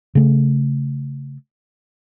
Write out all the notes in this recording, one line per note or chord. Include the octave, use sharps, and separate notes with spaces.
C#3 A3